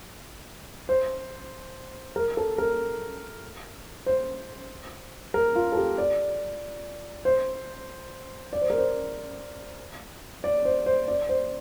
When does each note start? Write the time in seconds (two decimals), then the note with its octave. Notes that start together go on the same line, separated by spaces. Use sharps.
0.89 C5
2.16 A#4
2.37 A4
2.58 A#4
4.06 C5
5.34 A#4
5.55 F4
5.72 A4
5.77 G4
5.98 D5
7.25 C5
8.53 D5
8.61 C5
8.70 A#4
8.78 C5
10.44 D5
10.65 C5
10.86 C5
11.08 D5
11.29 C5